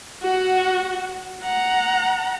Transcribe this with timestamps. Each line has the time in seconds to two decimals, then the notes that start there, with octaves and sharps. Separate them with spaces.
0.23 F#4 F#5
1.43 F#5 A#5